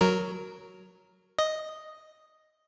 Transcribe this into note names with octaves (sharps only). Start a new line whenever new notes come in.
F#3 A#4
D#5